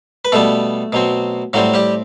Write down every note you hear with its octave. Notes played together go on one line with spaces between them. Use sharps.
B4
B2 G3 A3 B3 A4
B2 F#3 C4
A2 F#3 G3 C4 F#4
G3 G4